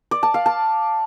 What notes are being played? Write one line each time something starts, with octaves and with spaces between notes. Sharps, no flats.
D5
A5
F5
A5